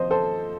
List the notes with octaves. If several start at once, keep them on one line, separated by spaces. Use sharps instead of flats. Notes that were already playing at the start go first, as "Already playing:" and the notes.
Already playing: F3 C4 F4 C5 D#5
A4 C5